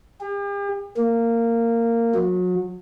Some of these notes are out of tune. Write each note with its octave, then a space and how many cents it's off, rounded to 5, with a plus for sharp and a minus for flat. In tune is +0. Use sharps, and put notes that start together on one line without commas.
G4 +45
A#3 -15
F#3 -30